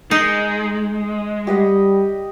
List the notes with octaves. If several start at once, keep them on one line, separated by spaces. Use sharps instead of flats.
G#3 D#4
G3 G4 D#5 F#5